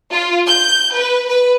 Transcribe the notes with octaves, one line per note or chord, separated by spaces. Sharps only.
F4
G6
B4
B4